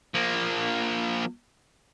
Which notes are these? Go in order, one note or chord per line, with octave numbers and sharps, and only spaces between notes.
F3 A#3